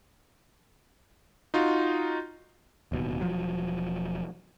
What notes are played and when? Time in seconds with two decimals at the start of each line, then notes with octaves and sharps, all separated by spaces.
1.54 D#4 F4 F#4
2.92 D1 D#2 B2
3.21 E1 F3 F#3